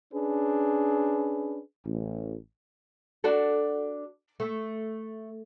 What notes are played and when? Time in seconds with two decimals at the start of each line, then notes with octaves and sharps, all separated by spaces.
0.13 C#4 D4 G#4 B4
1.85 A1
3.24 D4 F#4 A4
4.40 A3